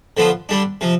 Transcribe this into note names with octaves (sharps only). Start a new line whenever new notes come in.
D3 F3 B3 F4
D3 G3 D4
C3 F3